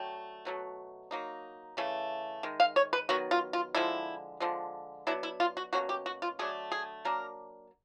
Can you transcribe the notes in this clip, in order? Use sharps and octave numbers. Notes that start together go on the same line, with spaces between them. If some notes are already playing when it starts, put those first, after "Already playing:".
Already playing: D3 F#3 A3 G5
B2 F#3 A3
F#3 A#3 D#4
C#3 E3 A3
D#3 G#3
F5
C#5
B4
D#3 F#3 B3 F#4
F4
F4
D3 F3 G#3 E4
D3 F3 G#3
F#3 B3 D4 E4
E4
F4
F#4
B2 F#3 A#3 C#4 F#4
G4
F#4
F4
D3 F#3 A3 D4 G#4
G#4
F#3 A#3 D4 A#4